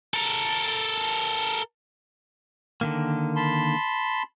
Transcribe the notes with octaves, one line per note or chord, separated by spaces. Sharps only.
A4 A#4
D3 D#3 A#3
A5 B5 C6